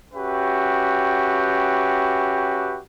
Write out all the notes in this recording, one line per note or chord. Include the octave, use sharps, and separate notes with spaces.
C#4 F#4 G4 B4 E5 G5